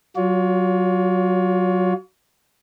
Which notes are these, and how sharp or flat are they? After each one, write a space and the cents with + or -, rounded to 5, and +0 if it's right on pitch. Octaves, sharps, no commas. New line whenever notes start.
F#3 +15 F4 +40 C#5 +35